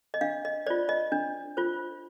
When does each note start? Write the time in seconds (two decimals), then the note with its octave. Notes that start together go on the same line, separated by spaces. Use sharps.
0.14 D#5
0.21 D4 F5
0.45 D#5
0.67 F4 C5 D5
0.89 D#5
1.12 D4
1.57 F4 C5